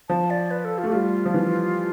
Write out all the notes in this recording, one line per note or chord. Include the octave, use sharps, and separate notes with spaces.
F3 A5
D5
B4
A4
F4
A3 G4
G3 F4
F3
E3